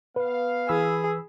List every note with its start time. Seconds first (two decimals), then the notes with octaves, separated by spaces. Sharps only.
0.16 B3 B4 F5
0.69 E3 G#4 B5 E6